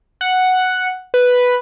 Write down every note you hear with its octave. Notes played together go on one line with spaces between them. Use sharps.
F#5
B4